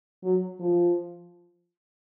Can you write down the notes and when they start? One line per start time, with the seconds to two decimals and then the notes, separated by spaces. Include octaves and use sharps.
0.24 F#3
0.59 F3